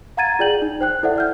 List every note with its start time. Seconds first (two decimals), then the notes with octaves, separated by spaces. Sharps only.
0.17 F5 F#5 A#5 G#6 A6 D#7
0.39 F4 G#4 D5 G5 G6 F#7
0.62 D#4
0.81 C5 G5 F#6
1.03 E4 A4 C5 D5 E5 F#5
1.16 D5 F6 G6